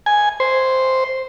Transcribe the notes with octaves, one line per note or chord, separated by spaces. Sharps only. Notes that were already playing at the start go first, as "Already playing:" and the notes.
G#5
C5